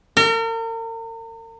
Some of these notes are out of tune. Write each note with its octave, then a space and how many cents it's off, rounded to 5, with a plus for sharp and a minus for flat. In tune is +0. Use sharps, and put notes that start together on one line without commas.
A#4 -40